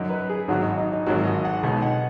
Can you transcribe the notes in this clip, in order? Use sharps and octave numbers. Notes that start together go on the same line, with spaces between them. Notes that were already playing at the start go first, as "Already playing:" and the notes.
Already playing: F#2 F#3 D#4
B4
G#4
G#1 G#2 F#3 F#4
D#4
D#4
D#4
G#1 G#2 D#3 F#3 F#4
D#5
F#5
B1 B2 G#3 D#4
F#5